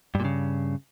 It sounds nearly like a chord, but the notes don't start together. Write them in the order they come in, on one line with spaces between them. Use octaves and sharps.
G2 A#2 C#3